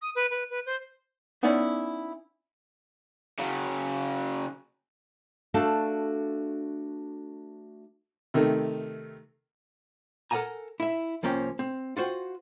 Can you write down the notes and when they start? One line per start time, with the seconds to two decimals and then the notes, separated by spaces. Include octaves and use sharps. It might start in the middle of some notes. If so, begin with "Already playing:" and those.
0.02 D#6
0.15 B4
0.30 B4
0.50 B4
0.66 C5
1.43 B3 C#4 D#4 E4 D5
3.39 C#3 F#3
5.54 A3 D4 F#4 A4 F5 A5
8.34 C3 D#3 A3
10.31 A4 A#4 D5 F#5 G#5 A#5
10.80 E4 E5
11.23 C2 F3 A#3 C#4 G5
11.59 C4
11.97 F4 F#4 C5 F#5 G5